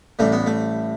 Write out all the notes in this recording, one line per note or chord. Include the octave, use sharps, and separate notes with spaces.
A1 A2 G3 A3
B3
A3